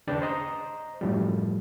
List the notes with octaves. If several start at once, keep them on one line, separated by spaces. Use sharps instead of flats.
D#2 C#3 D4 B4 G5 A5
C5 D#5 A#5
F#2 A2 F3 G3